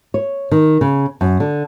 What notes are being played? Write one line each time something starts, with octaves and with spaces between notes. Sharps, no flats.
C#5
D#3
C#3
F#2
D3